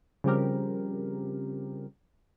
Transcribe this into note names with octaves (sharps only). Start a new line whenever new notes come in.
C#3 F3 G3 C4 G4 A#4